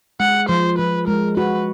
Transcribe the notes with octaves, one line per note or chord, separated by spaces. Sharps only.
G#3 F#5
F3 C5
F3 B4
G#3 A#4
F#4 B4